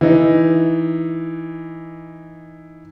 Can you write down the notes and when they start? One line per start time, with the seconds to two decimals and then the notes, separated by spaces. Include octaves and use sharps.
0.01 E3 D#4